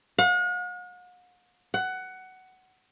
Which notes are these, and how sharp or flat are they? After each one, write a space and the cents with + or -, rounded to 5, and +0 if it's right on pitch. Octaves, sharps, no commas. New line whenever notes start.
F#5 -45
F#5 +15